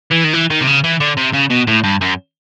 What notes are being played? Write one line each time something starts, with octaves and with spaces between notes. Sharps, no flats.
E3
D#3
E3
D#3
C3
C#3
E3
D3
C3
C#3
B2
A2
G2
F#2